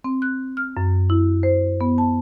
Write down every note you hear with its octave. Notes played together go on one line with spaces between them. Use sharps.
C4
F#6
F6
F#2
E4
C5
B3
A5